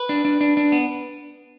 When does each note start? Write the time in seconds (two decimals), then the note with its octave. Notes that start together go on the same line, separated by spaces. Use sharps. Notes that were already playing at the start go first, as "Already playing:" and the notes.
Already playing: B4
0.09 D4
0.25 D4
0.41 D4
0.57 D4
0.72 B3